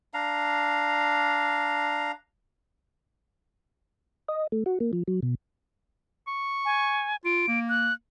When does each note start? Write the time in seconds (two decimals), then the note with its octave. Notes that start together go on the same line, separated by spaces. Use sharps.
0.14 D4 F5 A#5
4.28 D#5
4.52 A3
4.66 F#4
4.80 A#3
4.93 F3
5.08 F#3
5.23 B2
6.28 C#6
6.65 G#5
7.25 F4 D7
7.48 A#3
7.69 F#6